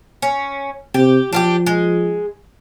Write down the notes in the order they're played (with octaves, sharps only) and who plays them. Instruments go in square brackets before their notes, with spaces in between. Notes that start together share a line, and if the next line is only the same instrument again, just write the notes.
[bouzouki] C#4
[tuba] C3 [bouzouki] G4
[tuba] F3 [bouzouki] D4 F4 G4
[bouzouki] G#3